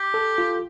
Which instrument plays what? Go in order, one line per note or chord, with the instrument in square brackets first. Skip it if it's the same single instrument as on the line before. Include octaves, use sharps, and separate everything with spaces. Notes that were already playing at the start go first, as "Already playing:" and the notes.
Already playing: [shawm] G4
[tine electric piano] A4
F4